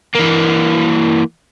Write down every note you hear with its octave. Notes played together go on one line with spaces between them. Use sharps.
E3 A#3